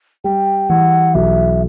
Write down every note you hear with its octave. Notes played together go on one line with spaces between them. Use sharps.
G3 G5
E3 F#5
B1 E5